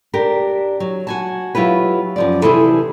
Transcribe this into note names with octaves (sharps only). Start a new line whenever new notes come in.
D4 G4 A#4
F#3
F#4 G#5 A5
F#3 E4 F4 G4 B4
F#2 F3 D5
C3 E3 E4 G#4 A4 B4